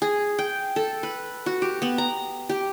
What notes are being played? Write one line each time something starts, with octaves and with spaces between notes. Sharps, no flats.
G#4
G5
A4
B4
F#4
G4
B3
A#5
G4